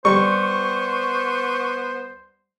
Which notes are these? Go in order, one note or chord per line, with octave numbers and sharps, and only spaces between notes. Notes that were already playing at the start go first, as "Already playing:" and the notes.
G3 B3 C5 C#6